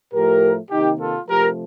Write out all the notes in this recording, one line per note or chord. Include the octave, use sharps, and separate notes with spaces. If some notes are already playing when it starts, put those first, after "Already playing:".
A2 F3 A3 G4 A#4
C3 D#3 A#3 D#4 G4
F4 A4
C3 F3 A3 G4 A#4